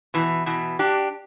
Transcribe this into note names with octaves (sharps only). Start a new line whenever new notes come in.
B2 E3
B2 E3
D4 G4